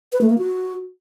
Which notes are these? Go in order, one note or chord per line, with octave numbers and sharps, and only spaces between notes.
B4
A3
A#3
F#4